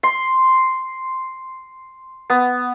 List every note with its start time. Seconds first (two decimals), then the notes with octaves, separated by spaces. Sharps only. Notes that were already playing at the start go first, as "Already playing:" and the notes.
0.03 C6
2.30 B3